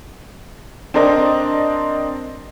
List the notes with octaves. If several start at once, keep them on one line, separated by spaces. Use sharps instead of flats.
C4 D4 A#4 D#5